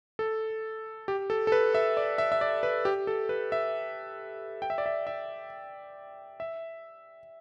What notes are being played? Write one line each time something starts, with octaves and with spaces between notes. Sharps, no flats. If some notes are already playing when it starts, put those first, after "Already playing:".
A4
G4
A4
A4
B4
E5
D5
E5
E5
D5
B4
G4
A4
B4
E5
G5
E5
D5
E5
E5
E5